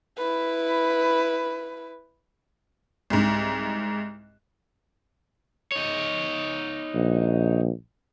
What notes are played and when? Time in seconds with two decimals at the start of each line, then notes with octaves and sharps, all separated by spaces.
0.17 E4 B4
3.10 C2 G#2
5.72 D#4 C#5
6.95 A#1